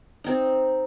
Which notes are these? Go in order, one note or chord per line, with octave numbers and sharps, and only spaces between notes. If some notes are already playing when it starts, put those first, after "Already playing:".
C4 D#4